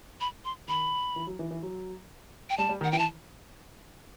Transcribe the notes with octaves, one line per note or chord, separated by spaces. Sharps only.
B5
C6
D#3 B5
E3
F#3
E3
E3
F#3
G5
G3 A5
G3
D#3
F#5
E3 G5
A5